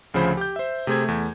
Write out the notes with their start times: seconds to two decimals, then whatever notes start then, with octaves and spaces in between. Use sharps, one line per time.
0.14 D2 C#3 F3 C5 B5
0.37 G4 G6
0.56 C5 E5
0.87 C3 A3 G#4 C5 G#6
1.04 E2 A3